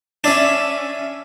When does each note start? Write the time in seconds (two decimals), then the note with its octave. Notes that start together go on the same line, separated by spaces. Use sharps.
0.24 C#4 D4 E5 D#7